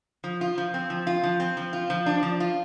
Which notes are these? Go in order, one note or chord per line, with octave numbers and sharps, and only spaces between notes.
F3
F4
F3
C4
F3
F4
F3
C4
F3
F4
F3
D4
F3
F4